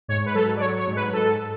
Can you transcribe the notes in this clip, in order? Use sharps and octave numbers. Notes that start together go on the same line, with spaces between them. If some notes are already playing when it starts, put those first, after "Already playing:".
G#2 C#5
B4
F#3 A4
D5
F#3 C#5
C#5
G#2
B4
G#2 A4